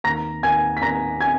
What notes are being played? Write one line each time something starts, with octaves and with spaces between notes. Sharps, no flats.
D#2 A#5 A#6
D#2 G#5 G#6
B6
D#2 A#5 A#6
G#5 G#6